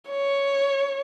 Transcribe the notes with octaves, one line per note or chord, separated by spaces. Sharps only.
C#5